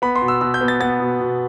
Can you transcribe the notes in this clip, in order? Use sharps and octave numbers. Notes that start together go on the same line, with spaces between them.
B3 B5
C6
B2
E6
B2 E6
G6
B3
A6
B3 A6
B2
B2